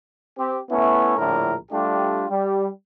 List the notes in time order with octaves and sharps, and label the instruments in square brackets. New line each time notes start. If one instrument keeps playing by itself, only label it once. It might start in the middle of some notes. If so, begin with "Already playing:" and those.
[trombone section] C4 G4
A3 B3 C#4 E4
A#1 A2 D3 E4 A#4
G3 A3 D4 F4 G4
G3